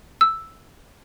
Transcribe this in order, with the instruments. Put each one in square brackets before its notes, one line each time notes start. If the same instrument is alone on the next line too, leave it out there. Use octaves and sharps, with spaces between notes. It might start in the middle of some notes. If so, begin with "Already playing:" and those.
[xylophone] E6